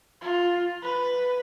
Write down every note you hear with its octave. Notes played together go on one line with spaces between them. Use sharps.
F4
B4